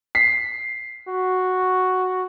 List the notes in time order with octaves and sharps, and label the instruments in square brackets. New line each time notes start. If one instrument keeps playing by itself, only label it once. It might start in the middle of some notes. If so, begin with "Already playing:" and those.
[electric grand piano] B6 C7
[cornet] F#4